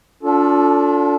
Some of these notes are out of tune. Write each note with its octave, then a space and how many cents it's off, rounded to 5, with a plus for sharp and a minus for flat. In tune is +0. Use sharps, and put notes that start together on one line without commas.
D4 -30 F4 +25 A4 +0